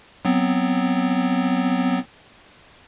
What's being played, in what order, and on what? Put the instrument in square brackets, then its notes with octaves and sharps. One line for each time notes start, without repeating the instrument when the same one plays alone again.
[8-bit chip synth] F#3 B3 C4